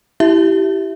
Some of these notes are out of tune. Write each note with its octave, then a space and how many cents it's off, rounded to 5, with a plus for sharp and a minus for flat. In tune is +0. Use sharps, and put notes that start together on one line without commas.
E4 +0 G4 -20 E5 +0